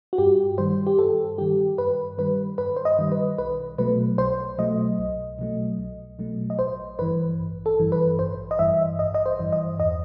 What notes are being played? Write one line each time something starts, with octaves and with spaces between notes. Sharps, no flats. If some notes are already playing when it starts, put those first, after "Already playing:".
F#4
G2 G4
D#3 G3 C5
G4
G2 A4
D#3 G3 G4
G2 B4
D#3 G3 B4
G2 B4
C5
D#5
D#3 G3
B4
B1 B4
B2 F#3 A3 B4
B1 C5
B2 F#3 A3 D#5
B1
B2 F#3 A3
B1
B2 F#3 A3
D#5
A1 C5
G2 E3 B4
A1
A4
G2 E3
B4
A1 C5
D#5
G2 E3 E5
A1 D#5
D#5
C5
G2 E3
D#5
E2 D#5